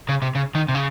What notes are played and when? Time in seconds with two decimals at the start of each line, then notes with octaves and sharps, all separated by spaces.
0.09 C#3
0.22 C3
0.35 C#3
0.55 D#3
0.68 C3
0.75 C#3